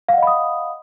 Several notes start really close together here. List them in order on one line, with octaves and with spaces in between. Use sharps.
F5 F#5 D#5 B5 D#6